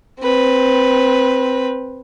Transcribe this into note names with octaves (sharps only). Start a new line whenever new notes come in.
C4 B4